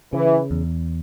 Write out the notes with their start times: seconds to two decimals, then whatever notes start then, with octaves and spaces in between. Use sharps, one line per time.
0.13 C#3 E3
0.51 E2